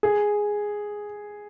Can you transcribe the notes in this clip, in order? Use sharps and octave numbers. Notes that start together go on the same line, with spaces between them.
G#4